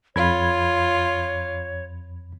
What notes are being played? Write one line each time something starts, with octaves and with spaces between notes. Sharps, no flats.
F2 F4 C#5 B5 G#6